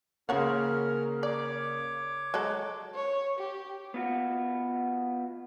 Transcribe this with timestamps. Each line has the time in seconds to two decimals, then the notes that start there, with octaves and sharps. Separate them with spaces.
0.29 C#3 F3 A#3 C#4 A#4 C#5 F#5 F6
1.23 C#5 D5 D6
2.34 F#3 G#3 A4
2.95 C#5
3.39 G4
3.94 B3 F4 F#4